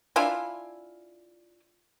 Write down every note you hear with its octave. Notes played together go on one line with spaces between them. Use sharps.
D4 E4 F4 G#5